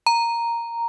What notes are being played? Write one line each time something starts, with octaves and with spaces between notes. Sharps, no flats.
A#5